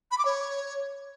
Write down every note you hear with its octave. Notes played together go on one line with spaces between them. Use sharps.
B5
D6
C#5